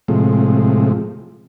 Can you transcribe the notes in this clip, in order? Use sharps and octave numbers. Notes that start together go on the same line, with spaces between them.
A2 C3 F3 G#3